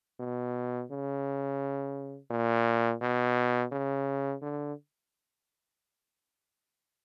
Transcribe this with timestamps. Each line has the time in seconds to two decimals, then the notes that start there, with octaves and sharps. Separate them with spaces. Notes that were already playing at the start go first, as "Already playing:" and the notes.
0.20 B2
0.91 C#3
2.31 A#2
3.02 B2
3.72 C#3
4.42 D3